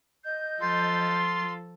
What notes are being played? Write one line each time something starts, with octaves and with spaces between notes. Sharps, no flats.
D#5 G6
F3 F4 A4 C6